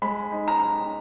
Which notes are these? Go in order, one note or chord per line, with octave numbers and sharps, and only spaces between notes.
G#3 B5
D#4
A#5
D#4